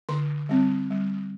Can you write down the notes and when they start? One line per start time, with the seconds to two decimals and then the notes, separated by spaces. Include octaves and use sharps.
0.09 D3 C6
0.49 G3 C4
0.91 G3